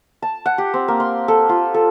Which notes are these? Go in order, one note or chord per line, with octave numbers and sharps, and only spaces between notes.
A5
F#5
G4
C4
A#3
C6
A4
F4
A4